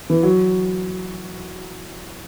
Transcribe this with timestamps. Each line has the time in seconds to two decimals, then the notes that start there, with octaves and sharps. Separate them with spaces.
0.10 E3
0.23 F#3